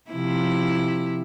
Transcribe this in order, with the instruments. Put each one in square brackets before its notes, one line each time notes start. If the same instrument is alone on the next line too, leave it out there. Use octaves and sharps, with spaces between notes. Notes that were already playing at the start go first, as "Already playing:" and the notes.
[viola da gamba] C3 F3 E4